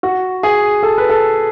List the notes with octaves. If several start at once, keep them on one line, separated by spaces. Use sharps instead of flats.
F#4
G#4
A4
B4
A4